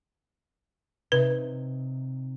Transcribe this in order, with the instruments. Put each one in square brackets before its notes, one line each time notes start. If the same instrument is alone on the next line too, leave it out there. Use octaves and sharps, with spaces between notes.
[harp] C3 D#4 [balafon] B4